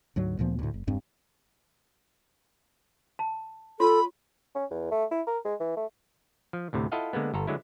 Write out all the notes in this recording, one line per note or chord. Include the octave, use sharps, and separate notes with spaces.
D2 G#2 F#3
D2 A#2 F3 B3
D2 A2
F#1
E1 G2 C4
A5
F4 A4 C#5 B5 C6
C#4
E2
A3
E4
A#4
G#3
E3
A3
F3
D2 A2 C3
E4 F4 A4 D#5 F5 F#5
D3 G#3 A#3 B3
G1 A4 A#5
D3 F#3 G#3 E4